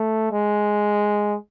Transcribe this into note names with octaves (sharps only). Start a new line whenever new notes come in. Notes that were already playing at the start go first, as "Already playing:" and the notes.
Already playing: A3
G#3